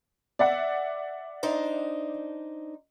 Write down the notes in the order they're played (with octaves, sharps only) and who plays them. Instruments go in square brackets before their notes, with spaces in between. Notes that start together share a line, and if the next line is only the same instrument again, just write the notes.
[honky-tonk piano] D5 E5 F#5
[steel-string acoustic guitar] D4 D#4 C5